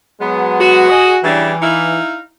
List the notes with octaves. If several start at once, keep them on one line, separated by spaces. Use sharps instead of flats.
F#3 G#3 B3
F#4
G#4 D#5
C#3 E3 G3 D4
D#4 E4 F5